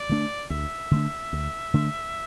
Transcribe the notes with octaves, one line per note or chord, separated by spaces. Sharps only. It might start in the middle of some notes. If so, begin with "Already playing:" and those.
Already playing: D5
D3 A3 D4
D2 E5
D3 A3 D4
D2
D3 A3 D4